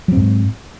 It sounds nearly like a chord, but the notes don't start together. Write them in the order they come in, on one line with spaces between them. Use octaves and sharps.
F#3 C4 G#2